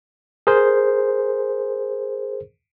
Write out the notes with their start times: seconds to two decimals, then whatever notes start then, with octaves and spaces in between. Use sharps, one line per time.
0.47 G#4 A#4 C5